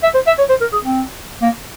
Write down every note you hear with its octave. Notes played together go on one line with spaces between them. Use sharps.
E5
C5
E5
C#5
C5
A#4
G#4
C4
A#3